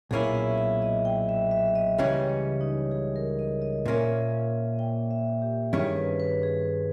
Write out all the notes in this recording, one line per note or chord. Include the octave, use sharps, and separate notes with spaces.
B1 A#2 A#3 C#4 E4 G#4
E5
E5
D#5
G5
E5
E5
D#5
C#2 C#3 E3 G3 C#4 D#5
C#5
D#4
G#4
A#4
D#5
D#5
A#2 A#3 C#4 E5
G5
E5
G4
G2 D#3 G3 C#4 E4 G#4
B4
B4
G#4